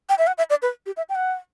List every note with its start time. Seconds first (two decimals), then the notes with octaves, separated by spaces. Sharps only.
0.09 G5
0.18 E5
0.27 F#5
0.38 E5
0.50 D5
0.62 B4
0.86 G4
0.97 E5
1.09 G5
1.15 F#5